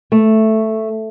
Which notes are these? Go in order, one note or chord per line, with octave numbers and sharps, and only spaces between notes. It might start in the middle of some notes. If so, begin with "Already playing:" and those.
A3